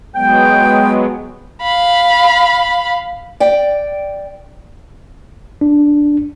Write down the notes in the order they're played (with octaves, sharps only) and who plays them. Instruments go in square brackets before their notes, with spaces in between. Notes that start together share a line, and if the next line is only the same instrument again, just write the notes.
[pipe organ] F#3 G#3 B3 [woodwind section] G5
[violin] F5 B5
[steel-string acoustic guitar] D5 G5
[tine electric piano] D4